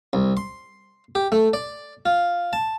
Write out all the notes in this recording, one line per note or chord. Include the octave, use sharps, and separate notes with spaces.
C2
C6
G4
A3
D5
F4
A5